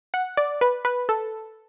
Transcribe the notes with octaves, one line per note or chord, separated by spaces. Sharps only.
F#5
D5
B4
B4
A4